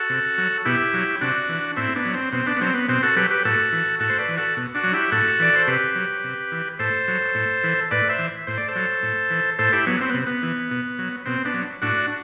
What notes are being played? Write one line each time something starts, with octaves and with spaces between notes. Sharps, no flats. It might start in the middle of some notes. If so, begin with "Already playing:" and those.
Already playing: F#4 A4
C3
F#3
B2 E4 G4
F#3
C3 D4 F#4
E3
A2 C4 E4
B3 D4
F#3
C4
B2 C4
B3 D4
B3
F#3 C4
B3
B2 C4
F#4 A4
F#3 G4 B4
G4 B4
A2 F#4 A4
E3
A2 F#4 A4
C5
B4 D5
E3
F#4 A4
B2
D4 F#4
F#3
E4 G4
A2 F#4 A4
E3 D5
C5
C3 G4 B4
F#3
C3
E3
A2 A4 C5
F#3
A2
E3
A2 B4 D5
C5 E5
E3
A2 C5
D5
A4 C5
F#3
A2
E3
A2 A4 C5
E4 G4
F#3 B3
C4
B3
C3
B3
E3
B2
F#3
B2 C4
B3 D4
F#3
A2 D4 F#4